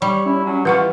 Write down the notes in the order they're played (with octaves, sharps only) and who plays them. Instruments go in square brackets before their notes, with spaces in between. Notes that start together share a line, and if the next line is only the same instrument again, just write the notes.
[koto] G3 [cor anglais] C#5
[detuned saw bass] C#4 [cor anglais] E4
[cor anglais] F#3
[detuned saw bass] E3 [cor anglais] F4 [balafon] B4 F#5 C#6